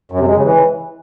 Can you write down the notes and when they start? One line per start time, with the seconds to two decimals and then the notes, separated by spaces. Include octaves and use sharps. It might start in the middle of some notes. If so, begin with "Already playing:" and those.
0.12 F#2
0.20 C3
0.28 G#3
0.36 C#3
0.44 E3